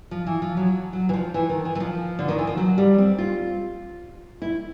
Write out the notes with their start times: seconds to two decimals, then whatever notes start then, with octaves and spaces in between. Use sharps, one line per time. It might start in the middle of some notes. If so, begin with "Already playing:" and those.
0.11 F3
0.26 E3
0.42 F3
0.57 F#3
0.93 F#3
1.09 E3
1.13 F3
1.34 E3
1.50 D#3
1.65 E3
1.75 E3
1.80 F3
2.19 D3
2.28 D#3
2.38 E3
2.47 F3
2.57 F#3
2.78 G3
2.98 C4
3.18 F4
4.42 E4